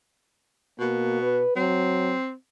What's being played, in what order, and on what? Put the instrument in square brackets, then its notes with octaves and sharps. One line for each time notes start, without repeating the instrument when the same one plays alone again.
[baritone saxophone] B2 [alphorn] A#3
[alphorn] B4
[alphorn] F#3 [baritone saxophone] C4